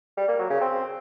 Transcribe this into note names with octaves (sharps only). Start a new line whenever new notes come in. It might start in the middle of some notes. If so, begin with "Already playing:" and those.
G3
A#3
F#3
C#3
C4